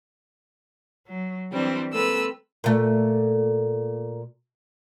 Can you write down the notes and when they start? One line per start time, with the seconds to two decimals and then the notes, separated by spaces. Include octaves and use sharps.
1.06 F#3
1.52 E3 G3 C4 D4
1.92 G#3 A#3 C4 A4 B4 E6
2.64 A#2 A3